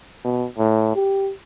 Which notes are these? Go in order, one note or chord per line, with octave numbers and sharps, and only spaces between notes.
B2
A2
G4